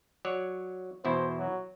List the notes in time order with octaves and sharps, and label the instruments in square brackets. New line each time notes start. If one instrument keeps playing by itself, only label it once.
[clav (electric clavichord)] F#3 C#5 D5
[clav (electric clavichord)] E2 B2 E4 [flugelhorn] C5
[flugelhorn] F#3